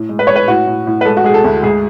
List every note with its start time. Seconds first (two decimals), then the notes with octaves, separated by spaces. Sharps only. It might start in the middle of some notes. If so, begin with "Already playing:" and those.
Already playing: A2
0.09 G#3
0.19 B4
0.27 G#3 C#5
0.36 B4
0.48 A2 F#4
0.67 A2
0.87 A2
1.01 B4
1.05 G#3 A4
1.17 F#4
1.24 G#3 G#4
1.34 A4
1.44 D2
1.63 G#2 G#4